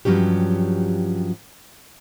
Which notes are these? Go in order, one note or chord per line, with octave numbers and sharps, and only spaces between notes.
G2 F3 F#3 C#4 G4